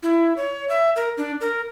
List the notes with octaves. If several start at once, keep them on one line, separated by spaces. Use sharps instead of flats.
E4
C#5
E5
A#4
D4
A#4